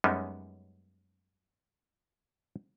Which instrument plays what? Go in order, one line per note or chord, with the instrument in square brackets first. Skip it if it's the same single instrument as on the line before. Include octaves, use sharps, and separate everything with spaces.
[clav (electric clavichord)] F#2 G3 G#3 B3 C#4 D#4